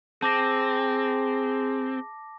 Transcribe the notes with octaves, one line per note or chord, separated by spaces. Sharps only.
C4 G#4 A5 D6 A#6